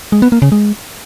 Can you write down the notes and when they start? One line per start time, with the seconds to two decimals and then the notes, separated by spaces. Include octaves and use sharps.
0.12 G#3
0.22 B3
0.32 A#3
0.42 C#3
0.52 G#3